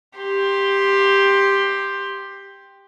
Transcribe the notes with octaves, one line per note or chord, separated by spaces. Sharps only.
G4 C6